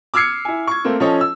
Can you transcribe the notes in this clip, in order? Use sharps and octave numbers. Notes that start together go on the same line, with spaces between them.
D6 E6 F6 G#6 C7 C#7
E4 G#5
C#6 G#6
A3 A#3 C4
F3 C#4 A4 C#5 D#5
E6